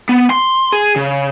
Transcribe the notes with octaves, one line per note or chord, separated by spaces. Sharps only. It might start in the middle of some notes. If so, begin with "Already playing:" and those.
B3
C6
G#4
C#3